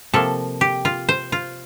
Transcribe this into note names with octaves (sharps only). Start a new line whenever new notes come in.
C3 F3 A#3 A4
G4
F4
C5
F4